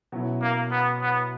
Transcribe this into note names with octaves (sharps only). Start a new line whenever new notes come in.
B2 F#3 C#4 E4
A#3
B3
B3